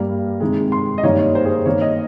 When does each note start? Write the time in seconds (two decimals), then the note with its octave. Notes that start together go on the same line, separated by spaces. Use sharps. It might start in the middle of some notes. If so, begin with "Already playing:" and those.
Already playing: G2 G3 A#3
0.40 C3 D#3 G#3
0.72 C6
0.98 D#5
1.03 G2 D#3 G3 A#3 C#5
1.19 C#5
1.35 C5
1.45 G#4
1.55 C5
1.66 G2 D#3 A#3 C#5
1.81 D#5